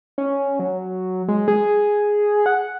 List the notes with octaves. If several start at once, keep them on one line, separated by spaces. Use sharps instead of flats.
C#4
F#3
G#3
G#4
F#5